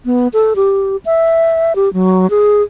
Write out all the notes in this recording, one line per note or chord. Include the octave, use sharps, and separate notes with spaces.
B3
A4
G4
E5
G4
F#3
G#4